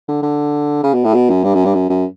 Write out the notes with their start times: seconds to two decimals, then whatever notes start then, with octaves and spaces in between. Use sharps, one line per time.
0.08 D3
0.22 D3
0.83 C#3
0.94 B2
1.04 A2
1.14 B2
1.30 F#2
1.44 G2
1.54 F#2
1.65 G2
1.74 F#2
1.89 F#2